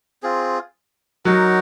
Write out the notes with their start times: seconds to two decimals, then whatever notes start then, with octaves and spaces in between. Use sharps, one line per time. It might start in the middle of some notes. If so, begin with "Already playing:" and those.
0.23 C4 F4 G#4
1.25 F#3 D#4 A#4 C#5 F#5